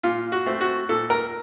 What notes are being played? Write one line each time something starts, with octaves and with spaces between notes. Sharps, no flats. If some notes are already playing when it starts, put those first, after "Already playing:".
A#2 F4
F#4
A3 C4
F#4
A#2 A4
A#4